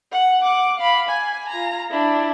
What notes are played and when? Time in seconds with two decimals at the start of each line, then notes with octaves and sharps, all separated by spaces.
0.12 F#5
0.43 F#5 D6
0.78 F5 B5
1.09 G#5
1.49 F4 A#5
1.90 D4 E4